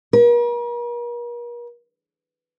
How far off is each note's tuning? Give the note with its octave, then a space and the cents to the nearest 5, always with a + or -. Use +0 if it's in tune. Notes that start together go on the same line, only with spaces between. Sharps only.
A#4 +45